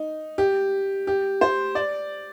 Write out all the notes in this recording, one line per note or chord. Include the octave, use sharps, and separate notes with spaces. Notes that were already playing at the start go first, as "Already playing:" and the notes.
Already playing: D#4
G4
G4
C5
D5